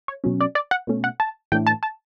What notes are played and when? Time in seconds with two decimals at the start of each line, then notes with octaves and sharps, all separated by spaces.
0.08 C#5
0.24 B2 F#3 C#4
0.41 D5
0.55 D5
0.71 F#5
0.87 B2 A3 C#4
1.04 F#5
1.20 A5
1.52 A2 E3 A3 D4 G5
1.67 A5
1.83 A5